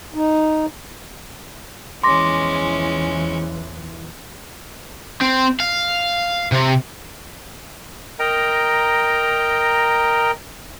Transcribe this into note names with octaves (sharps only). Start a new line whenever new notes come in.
D#4
E2 E3 F3 G#3 C#4 C6 D6 A#6
C4
F5
C3
A#4 D#5 G5 A#5